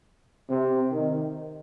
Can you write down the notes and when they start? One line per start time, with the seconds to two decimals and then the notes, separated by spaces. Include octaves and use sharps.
0.50 C3
0.92 D#3